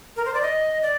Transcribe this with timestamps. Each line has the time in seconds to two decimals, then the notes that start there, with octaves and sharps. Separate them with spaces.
0.16 A#4
0.25 C5
0.34 D5
0.42 D#5
0.82 D5